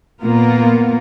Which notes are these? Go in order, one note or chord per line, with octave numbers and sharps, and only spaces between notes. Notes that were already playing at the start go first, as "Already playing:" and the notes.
A#2 A#3 B3 F4 A#4